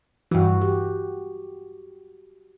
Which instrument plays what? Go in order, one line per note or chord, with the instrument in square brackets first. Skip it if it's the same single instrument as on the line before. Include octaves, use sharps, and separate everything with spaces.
[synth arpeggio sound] G2 E3 [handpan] F#4
[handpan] G4